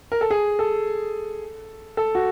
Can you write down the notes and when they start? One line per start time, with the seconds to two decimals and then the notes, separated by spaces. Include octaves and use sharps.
0.12 A#4
0.21 A4
0.31 G#4
0.59 A4
1.97 A4
2.15 F#4